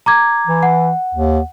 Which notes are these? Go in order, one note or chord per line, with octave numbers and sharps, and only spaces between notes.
A#5 D6 G#6
E3
F#5
D#2